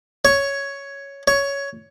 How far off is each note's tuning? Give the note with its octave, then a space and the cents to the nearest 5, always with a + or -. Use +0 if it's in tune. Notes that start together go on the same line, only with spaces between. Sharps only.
C#5 +5
C#5 +10